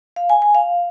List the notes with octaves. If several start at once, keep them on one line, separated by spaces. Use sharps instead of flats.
F5
G#5
G#5
F5